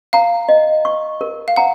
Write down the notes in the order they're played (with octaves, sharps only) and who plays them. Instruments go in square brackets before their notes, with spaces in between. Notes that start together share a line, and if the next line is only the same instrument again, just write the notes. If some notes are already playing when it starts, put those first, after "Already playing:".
[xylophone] F5 [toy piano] A#5
[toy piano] D#5
C#6
A#4
[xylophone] F5
[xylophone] F#5 [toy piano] A#5